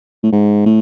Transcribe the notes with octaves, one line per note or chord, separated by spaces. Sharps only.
A2
G#2
A2